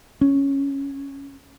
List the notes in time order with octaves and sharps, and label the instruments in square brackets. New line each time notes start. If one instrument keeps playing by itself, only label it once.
[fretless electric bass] C#4